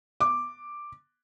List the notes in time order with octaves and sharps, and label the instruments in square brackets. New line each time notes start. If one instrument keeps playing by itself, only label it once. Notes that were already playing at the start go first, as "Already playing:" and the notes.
[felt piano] D6